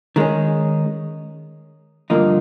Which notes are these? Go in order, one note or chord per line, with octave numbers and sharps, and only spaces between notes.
D#3 G#3 C#4
G2 D3 F3 A#3 D#4